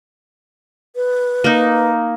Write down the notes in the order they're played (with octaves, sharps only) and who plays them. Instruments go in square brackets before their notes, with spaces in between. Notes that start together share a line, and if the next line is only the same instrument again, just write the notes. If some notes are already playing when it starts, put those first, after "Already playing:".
[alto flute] B4
[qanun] A#3 D#4